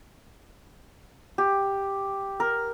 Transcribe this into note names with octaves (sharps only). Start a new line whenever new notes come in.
G4
A#4